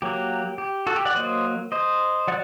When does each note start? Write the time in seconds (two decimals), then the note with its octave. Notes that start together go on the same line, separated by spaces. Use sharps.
0.02 F#3 A#3 G4
0.58 G4
0.87 F#4 A4
0.96 G4
1.05 D5 F#5
1.15 F#3 A#3 C5 D#5
1.72 C5 D#5
2.28 F#3 D5 F#5